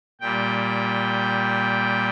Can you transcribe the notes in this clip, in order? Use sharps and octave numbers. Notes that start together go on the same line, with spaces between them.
A#2 G3 G5